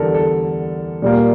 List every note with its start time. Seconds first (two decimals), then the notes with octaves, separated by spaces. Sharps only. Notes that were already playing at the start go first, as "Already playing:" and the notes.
Already playing: E2 D3 G3 A4 A#4
0.14 A4
1.02 A#2 G3 A#3